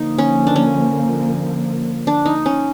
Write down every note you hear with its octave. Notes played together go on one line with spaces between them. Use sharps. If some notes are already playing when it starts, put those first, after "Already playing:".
Already playing: D3 F3 A#3 D#4
C#4
D4
C#4
D4
D#4
C#4